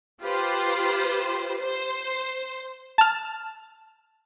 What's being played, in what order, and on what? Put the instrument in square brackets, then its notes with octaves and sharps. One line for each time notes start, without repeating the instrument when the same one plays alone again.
[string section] F4 G4 B4 C5
C5
[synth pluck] A5 F6